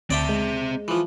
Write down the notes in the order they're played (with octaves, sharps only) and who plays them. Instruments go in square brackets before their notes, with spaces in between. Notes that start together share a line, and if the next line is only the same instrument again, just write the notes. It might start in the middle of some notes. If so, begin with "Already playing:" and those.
[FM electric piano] D2 [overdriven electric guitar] C4 E5 [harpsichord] D5 G5 A5
[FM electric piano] G#3
[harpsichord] E3 F3